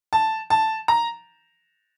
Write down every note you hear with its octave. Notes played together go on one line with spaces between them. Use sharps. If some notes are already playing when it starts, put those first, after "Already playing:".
A5
A5
A#5